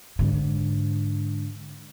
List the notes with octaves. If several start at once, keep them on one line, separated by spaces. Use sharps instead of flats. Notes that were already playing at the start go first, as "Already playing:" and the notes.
G#2 D3